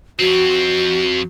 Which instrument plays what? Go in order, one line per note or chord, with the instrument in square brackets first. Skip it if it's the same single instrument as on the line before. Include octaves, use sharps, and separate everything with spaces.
[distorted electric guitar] F2 C4 [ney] F#4